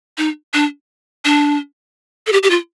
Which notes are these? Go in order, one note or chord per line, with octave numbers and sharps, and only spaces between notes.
D#4
D4
D4
A4
G4
G4
F4